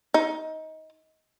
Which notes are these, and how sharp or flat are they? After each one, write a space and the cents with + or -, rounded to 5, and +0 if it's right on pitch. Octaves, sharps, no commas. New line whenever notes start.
D#4 +20